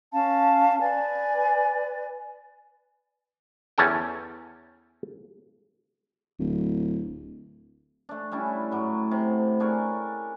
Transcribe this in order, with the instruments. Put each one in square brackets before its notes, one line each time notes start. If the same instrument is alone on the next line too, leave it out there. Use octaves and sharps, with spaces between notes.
[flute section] C#4 F5 A5
B4 D5 G#5
[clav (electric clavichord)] E2 C#4 A4 G5
[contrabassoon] D1
[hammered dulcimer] A3 D4
G3 C#4 D4 E4
A2 F#3 D6
C3
D4 G#4 A#4 C#5